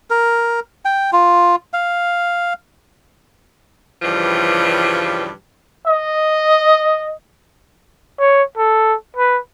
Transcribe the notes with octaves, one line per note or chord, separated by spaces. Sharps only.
A#4
G5
F4
F5
G2 C#3 E3 F3 G3
D#5
C#5
A4
B4